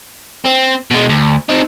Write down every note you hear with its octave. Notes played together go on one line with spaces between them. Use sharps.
C4
B2 G#3
D2
C4 D#4